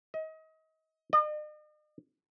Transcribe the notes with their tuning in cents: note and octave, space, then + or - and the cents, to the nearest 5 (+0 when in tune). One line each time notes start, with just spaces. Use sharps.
D#5 +30
D#5 -45